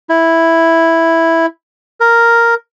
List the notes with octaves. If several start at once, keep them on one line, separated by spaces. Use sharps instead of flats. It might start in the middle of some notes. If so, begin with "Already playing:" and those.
E4
A#4